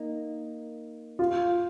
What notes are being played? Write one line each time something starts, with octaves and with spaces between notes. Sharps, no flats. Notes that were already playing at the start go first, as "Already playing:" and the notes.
Already playing: A#3 D#4
F4